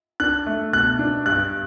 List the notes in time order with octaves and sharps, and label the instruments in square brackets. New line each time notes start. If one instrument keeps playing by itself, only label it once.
[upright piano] D4 [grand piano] F#6
[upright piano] A3
[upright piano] B2 [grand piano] F#6
[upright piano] D4
[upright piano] G2 [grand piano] F#6